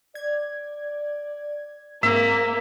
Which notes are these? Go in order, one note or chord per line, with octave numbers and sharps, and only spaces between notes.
D5 G#6
G#2 A#3 C4 E5